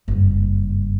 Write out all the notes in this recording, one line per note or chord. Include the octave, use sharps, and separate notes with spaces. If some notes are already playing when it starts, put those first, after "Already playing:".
F#1 G2